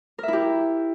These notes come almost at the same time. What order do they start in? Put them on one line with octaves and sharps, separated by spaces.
A#4 E5 E4 G4